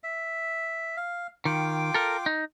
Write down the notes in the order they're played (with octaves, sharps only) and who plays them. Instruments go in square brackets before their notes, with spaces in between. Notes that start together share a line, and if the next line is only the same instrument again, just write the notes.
[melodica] E5
F5
[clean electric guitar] D#3 [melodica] F4 G5 D6
[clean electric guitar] A4 A#4
D#4